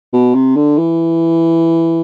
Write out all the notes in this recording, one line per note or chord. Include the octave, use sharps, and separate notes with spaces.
B2
C3
D3
E3